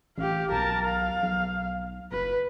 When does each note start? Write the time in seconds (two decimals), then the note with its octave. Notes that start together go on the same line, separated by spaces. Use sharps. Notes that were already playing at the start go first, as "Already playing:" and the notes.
0.18 A1 G4 F5
0.51 B1 A#4 A5
0.85 F5
1.23 B1
2.12 F#1 B4